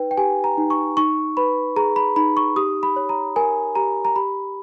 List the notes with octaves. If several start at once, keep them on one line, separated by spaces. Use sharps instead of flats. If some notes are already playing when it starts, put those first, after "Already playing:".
Already playing: D#4 B4 G5
G5
G4 G#5
A#5
D#4
C#6
D#4 C#6
B4 B5
G#4 A#5
B5
D#4 B5
C#6
G4 D#6
B5
C#5
A#5
A#4 G#5
G4 A#5
A#5
G4 B5